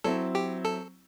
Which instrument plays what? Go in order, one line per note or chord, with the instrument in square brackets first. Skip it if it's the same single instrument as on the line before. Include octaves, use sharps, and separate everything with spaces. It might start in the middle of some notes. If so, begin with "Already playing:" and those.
[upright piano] F#3 C4 E4 [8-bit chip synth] A4
[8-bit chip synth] G4
A4